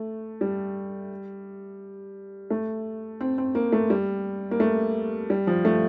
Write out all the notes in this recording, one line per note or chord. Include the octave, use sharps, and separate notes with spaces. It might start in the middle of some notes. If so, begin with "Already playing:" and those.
Already playing: A3
G3
A3
C4
C4
A#3
A3
G3
A#3
A3
G3
F3
A3